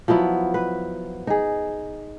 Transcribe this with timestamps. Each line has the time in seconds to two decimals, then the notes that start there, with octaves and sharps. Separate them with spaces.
0.08 F3 F#3 B3 E4
0.54 B4
1.27 D#4 G#4